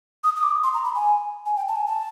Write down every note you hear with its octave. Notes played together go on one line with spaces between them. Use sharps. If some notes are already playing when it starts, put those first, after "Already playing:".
D#6
D#6
D6
C6
A#5
B5
G#5
G#5
G5
A5
G#5
A5